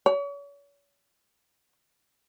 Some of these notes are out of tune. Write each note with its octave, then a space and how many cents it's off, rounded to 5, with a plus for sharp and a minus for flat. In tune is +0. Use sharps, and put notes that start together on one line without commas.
C#5 +40